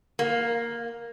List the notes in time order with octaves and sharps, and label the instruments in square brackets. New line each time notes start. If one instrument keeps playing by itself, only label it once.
[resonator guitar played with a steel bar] A#3